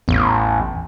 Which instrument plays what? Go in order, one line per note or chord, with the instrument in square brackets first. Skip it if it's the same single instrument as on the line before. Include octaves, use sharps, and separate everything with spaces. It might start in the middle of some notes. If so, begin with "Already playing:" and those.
[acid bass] A1 [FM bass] E2